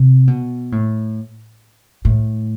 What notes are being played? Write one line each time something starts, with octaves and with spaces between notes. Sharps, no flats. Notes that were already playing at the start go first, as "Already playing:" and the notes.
Already playing: C3
B2
A2
A2